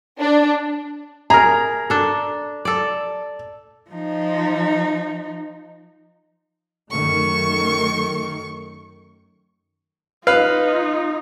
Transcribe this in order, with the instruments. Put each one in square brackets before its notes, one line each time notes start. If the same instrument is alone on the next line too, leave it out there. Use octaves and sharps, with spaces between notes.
[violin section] D4
[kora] G#4 A#4 [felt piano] A#5
[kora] D4 A4
A4 D5
[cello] F3 D#4
[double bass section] F#2 D#3 A3 [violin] C#6
[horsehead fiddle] D#4 F4 [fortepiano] B4 F5